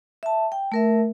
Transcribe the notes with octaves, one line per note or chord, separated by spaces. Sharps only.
E5 A5
G5
A3 A#4 E5